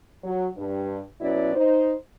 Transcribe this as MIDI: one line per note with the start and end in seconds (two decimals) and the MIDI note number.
0.24 0.48 54
0.57 0.99 43
1.21 1.55 47
1.21 1.55 54
1.21 1.55 59
1.21 1.55 61
1.21 1.55 64
1.21 1.55 74
1.55 1.93 63
1.55 1.93 72